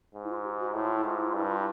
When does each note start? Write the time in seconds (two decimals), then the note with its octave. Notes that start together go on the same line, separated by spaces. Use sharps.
0.14 G#2
0.24 E4
0.29 F4
0.44 G4
0.59 F#4
0.74 A2 E4
0.84 F4
0.95 E4
1.04 G#2 F4
1.16 E4
1.25 F4
1.35 G2 E4
1.46 F4
1.57 E4